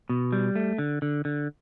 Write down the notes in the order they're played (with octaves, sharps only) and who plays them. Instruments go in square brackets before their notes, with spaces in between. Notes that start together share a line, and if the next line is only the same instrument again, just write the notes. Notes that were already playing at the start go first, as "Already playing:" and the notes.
[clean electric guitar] B2
G3
A3
D3
D3
D3